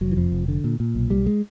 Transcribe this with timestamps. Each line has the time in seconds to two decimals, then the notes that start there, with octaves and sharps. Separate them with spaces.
0.01 F1 F#3
0.11 E3
0.17 F2 F3
0.32 F1
0.48 D3
0.64 A#2
0.80 A#2
0.95 B1
1.10 B1 G3
1.26 G#3